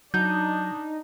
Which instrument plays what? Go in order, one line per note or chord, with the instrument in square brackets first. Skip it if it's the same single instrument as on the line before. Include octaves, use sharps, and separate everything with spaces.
[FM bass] F#3 [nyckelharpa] D4 [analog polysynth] D#4 [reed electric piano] G6